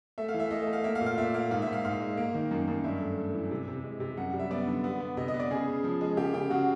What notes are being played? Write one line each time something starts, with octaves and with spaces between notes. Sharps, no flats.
A3 E5
F5
E3
E5
A3 D#5
E5
A3
F5
A#3 E5
F5
A#2
F5
A#2 E5
A#3 F5
G#2 F5
E5
G#2
F5
G#2 F5
G#3
A#3
D#3
F#2
F#2
G2 E5
A3
A3
E3
C3
C3
G#3
C3
F#2 F#5
G3
E5
B3 D5
D3
B3
B3
C3 D#5
D#5
B3
D5
C#3 G#4
C#3
F3
G#3
C#3 G4
C#3 G4
C#3 F#4